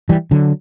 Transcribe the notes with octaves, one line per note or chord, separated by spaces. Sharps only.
E3 G3
D3 F#3